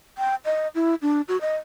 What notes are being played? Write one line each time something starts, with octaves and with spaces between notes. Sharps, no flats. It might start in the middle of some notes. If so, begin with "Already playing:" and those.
G5
D#5
E4
D4
F#4
D#5